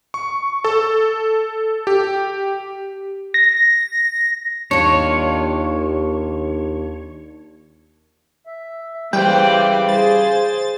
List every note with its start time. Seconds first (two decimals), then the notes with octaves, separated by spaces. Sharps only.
0.14 C#6
0.64 A4
1.87 G4
3.34 A#6
4.71 D#2 D4 F4 C#5
8.47 E5
9.13 C#3 E3 G3 C5 D5 G5
9.89 G#4 C5 A6